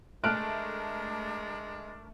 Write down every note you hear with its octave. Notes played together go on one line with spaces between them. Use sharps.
G#3 A3 D4 A#4 A5 F6 F#6 D7